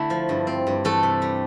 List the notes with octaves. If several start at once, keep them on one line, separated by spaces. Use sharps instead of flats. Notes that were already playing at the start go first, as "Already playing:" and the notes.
Already playing: D3 A3 E4 E5
F3
G2
C4
G2
E3 A3 A4
C3
G3